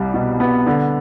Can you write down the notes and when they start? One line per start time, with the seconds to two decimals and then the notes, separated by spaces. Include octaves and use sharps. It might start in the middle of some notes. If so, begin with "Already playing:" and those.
Already playing: C2 G3
0.14 B2
0.40 B3
0.66 D3